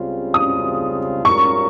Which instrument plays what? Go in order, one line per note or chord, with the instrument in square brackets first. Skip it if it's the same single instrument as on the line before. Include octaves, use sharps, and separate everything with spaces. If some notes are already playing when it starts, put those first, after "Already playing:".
Already playing: [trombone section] C#2 C#3 G3 C4 F4
[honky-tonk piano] D#6
[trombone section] G#2 G3 C#4 F4 A#4 [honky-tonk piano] C#6